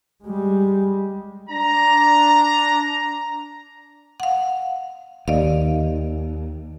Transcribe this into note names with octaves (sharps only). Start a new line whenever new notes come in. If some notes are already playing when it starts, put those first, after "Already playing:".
G3 G#3
D4 A#5
F5 F#5
D#2 D5 D#5 F5